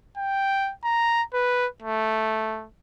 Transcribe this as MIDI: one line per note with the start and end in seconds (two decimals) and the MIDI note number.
0.17 0.71 79
0.84 1.22 82
1.34 1.66 71
1.82 2.66 57